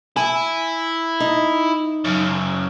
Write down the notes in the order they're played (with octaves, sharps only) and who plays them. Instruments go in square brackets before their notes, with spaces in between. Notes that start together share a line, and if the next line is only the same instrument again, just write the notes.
[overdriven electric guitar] E4 [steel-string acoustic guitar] G#5
[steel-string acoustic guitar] D#4
[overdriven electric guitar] F#2 C#3